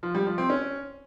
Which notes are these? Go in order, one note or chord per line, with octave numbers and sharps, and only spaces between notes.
F3
G3
F3
C4
C#4